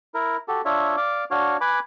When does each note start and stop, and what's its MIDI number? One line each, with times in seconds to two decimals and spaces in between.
0.14 0.37 64
0.14 0.37 70
0.48 0.61 66
0.48 0.61 67
0.48 0.61 69
0.65 0.96 62
0.65 0.96 65
0.65 0.96 73
0.65 0.96 76
0.97 1.24 74
0.97 1.24 77
0.97 1.24 86
1.31 1.57 62
1.31 1.57 66
1.31 1.57 73
1.31 1.57 77
1.61 1.79 71
1.61 1.79 80
1.61 1.79 83
1.61 1.79 86